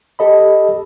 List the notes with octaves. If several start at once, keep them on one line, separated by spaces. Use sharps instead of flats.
G4 A4 D#5 B5